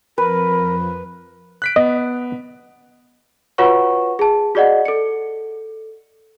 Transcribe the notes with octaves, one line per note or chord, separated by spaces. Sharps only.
F2 F3 A#4 B4
F#6 B6 D7
B3 D#5
F4 F#4 B4 C#5 F#5 C#6
G#4 A5
F#4 G#4 D5 D#5 F#5
A4 C#7